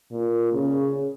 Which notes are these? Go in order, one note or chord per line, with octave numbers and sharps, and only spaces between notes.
A#2
C#3